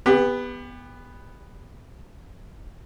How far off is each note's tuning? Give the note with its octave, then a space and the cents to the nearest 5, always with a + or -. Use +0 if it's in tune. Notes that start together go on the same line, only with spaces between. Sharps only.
B3 +0 G4 +35